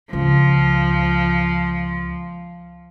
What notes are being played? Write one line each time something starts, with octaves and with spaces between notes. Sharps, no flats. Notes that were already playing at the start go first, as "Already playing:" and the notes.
C#2 F3